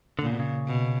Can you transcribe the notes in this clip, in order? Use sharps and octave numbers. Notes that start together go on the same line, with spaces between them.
A#2 D3
C#3
B2
C#3
B2